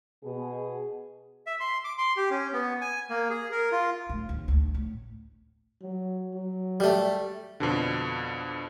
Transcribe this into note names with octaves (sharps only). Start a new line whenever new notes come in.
B2 G#4
E5
C6
D6
C6
G4
C#4
B3
G#5
A#3
G#4
A#4
F4
A2
D#2
A1 D2
A2
F#3
F#3
G3 A3
F2 B2 D3